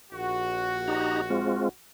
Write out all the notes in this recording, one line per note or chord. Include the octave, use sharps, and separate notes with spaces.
A#1 F#4
D#4 G4 A#5
G#3 C4 F4